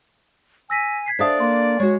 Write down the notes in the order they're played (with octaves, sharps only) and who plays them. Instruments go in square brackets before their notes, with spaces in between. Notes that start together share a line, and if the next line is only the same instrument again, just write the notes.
[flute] G#5 [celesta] E6 A#6 B6
[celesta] G#6 B6 C7
[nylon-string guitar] D4 A4 F5 [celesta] C5 E5 D#6 [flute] D5
[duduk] A#3 [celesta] C6
[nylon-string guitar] G#3 F#4 [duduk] C#5